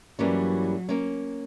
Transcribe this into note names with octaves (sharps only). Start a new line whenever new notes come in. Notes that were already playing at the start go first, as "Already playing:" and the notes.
G2 E3 F#3 G3 A#3 C#4
A#3 C#4